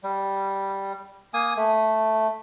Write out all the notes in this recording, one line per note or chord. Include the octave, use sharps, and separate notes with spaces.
G3
A#3 G#5 D#6
A3